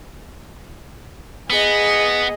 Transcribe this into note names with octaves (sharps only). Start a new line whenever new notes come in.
B3 G#4 D#5